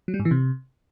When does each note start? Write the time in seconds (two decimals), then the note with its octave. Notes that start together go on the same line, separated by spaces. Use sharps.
0.08 F#3
0.14 G3
0.20 G#2
0.25 E3
0.31 C3